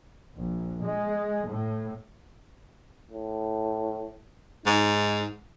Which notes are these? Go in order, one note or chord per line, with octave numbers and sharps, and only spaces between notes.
A#1
G#3
A2
A2
G#2 D#4